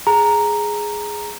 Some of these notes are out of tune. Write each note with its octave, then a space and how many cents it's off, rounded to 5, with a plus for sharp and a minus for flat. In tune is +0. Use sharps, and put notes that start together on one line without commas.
G#4 +5 A#5 +0